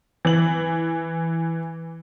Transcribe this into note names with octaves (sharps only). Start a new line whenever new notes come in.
E3 F#7